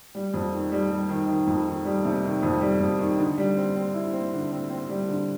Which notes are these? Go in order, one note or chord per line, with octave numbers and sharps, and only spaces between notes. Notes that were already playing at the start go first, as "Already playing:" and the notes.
G3
F2
D#3
G3
G3
D#3
D#3
F2
D#3
G3
C3
D#3
F2
G3
F2
D#3
D3
G3
C4
C4
E4
C4
D3
C4
C4
G3
D3